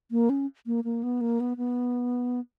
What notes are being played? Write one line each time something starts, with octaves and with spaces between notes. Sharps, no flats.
A#3
C#4
A#3
A#3
B3
A#3
B3
B3